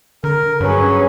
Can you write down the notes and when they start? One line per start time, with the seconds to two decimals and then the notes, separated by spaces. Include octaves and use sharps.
0.24 D3 A#4
0.60 G2 F#3 C#4 G#4 B4